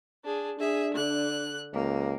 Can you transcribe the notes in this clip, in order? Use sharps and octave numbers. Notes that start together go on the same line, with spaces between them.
D4 G#4
D4 G#4 E5
D3 F#6
C#2 A#3